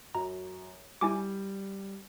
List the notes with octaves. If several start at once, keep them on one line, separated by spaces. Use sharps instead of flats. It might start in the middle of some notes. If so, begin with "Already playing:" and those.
F#2 A#5
G3 E4 G#5 D6